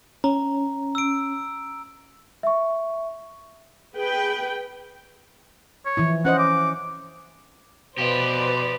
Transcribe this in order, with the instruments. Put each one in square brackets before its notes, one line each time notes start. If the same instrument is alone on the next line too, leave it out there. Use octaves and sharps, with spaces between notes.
[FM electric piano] C#4 [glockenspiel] A#5
[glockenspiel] E6 D7
[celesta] E5 C#6
[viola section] G#4 B4 G5
[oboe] C#5
[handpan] E3 F3 E4
[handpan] C#4 C5 D#5 [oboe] F#5
[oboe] D6
[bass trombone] B2 [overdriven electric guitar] F3 G4 [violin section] B4 C5 D5